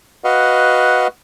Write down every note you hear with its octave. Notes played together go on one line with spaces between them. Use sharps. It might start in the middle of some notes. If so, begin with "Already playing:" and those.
F#4 B4 D#5 F5 F#5